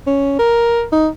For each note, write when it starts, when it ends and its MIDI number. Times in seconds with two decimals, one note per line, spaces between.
0.07 0.36 61
0.39 0.83 70
0.92 1.08 63